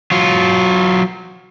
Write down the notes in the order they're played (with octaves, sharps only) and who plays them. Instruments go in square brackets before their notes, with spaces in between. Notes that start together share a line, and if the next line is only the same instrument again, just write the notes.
[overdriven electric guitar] F#3 F4